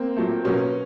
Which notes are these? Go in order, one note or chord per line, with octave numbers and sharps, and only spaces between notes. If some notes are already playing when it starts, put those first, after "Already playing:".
Already playing: A#3 C4
A#2 F#3 A3
B2 F#3 A#3 B3 C#4